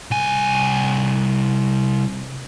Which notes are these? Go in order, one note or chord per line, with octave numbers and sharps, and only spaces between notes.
C2 G#5